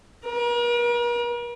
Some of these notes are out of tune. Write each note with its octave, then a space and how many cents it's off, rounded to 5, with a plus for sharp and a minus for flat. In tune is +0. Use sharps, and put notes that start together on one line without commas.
A#4 +45